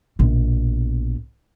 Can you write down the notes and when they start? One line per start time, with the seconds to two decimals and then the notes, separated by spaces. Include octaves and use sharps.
0.19 A#1 B2